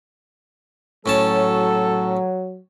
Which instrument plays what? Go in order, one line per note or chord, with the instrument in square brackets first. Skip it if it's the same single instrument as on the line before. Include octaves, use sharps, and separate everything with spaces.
[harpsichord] A2 C#4 A5 [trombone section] F#3 [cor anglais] A4